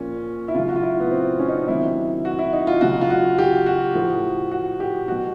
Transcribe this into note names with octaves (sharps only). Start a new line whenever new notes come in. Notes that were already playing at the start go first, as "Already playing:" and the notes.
Already playing: A#2 F3 C#4
E4
C#3 F#3 F4
F#4
F4
E4
B3
C4
C#4
D#4
D4
C3 D#3 F#3 E4
F#4
E4
D#4
F4
C#3 F#3 F#4
F4
F#4
G4
F#4
A2 F3
F#4
G4
B2 F#3 F#4